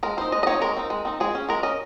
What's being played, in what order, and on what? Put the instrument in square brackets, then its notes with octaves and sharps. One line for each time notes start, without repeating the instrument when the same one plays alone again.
[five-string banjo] G#3 A#4
C4 D#4 C5
G#3 D#5
D#5
C4 D#4 C#5
G#3 A#4
C4 D#4
G#3
C4 D#4
G#3 G#4
C#4
G#3 A#4
C#4 D#5